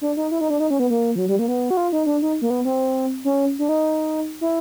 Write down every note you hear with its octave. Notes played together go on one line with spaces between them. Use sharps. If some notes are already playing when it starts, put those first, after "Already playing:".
D4
D#4
E4
D#4
D4
D#4
C#4
B3
A#3
F3
F#3
G3
A#3
B3
F#4
F4
D#4
D4
D#4
A#3
B3
C4
C#4
D4
D#4
E4